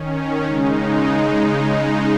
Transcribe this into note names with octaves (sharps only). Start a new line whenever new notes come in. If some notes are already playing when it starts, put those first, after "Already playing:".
Already playing: D#3 C#4
C#3 G#3 D#4